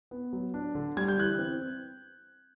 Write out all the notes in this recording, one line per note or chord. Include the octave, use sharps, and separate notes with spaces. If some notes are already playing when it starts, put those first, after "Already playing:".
B3
F#3
D4
D3
G3 G#6
G6
E3 F#6 G#6
C4